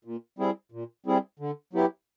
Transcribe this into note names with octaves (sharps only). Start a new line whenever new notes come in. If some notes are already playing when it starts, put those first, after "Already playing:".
A#2
G3 C4 E4 G#4
A#2
G3 C4 E4 G#4
D3
F#3 B3 E4 G4